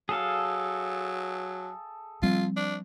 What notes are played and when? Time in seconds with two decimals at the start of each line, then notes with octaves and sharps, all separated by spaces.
0.09 F#3 G#4 A4 F5
2.22 F3 G3 C4 F4
2.57 D4